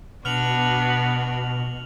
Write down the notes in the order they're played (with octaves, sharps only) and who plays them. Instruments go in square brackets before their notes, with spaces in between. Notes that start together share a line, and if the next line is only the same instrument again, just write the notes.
[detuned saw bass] B2 [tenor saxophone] B3 [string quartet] D4 F#4 [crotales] F6 F7 F#7